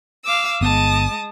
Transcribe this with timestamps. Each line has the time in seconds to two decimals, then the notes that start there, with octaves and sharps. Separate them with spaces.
0.23 F5 D6 E6
0.61 G1 G#3 B3 A5 D#6